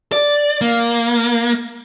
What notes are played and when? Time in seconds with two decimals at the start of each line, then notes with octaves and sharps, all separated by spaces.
0.12 D5
0.61 A#3